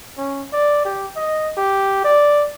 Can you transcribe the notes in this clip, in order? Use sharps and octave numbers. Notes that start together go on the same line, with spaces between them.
C#4
D5
G4
D#5
G4
D5